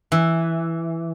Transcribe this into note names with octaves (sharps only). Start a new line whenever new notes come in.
E3